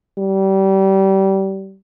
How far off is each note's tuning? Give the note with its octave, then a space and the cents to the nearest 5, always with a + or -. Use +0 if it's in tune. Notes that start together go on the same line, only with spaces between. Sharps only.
G3 -25